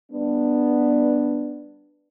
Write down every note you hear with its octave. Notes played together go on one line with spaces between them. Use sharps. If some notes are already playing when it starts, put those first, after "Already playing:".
G3 B3 D4